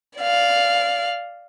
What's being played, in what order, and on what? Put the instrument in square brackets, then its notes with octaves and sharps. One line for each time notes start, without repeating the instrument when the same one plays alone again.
[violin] D5 F5